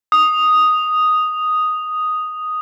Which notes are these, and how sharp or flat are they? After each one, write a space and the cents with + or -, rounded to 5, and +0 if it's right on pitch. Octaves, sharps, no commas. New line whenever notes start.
D#6 +0